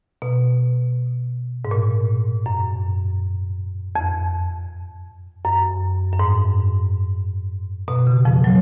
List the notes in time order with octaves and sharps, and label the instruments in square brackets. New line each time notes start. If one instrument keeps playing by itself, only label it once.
[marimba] B2
G#2
A#2
F#2
F2
F#2
F#2
G#2
B2
C#3
F2 F3
F#3